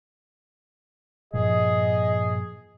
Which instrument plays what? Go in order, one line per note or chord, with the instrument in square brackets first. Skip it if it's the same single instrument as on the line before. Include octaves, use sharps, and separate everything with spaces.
[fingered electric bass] G2 A#2 F3 [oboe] G#4 [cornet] D#5